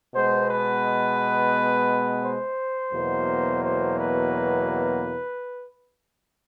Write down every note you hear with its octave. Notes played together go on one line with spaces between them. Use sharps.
B2 G#3 B3 C5
B4
C5
E2 B2 F#3 A#3
C5
B4